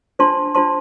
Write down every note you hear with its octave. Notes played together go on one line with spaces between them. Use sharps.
D4 F4 C5 A5 C6
D4 F4 C5 A5 C6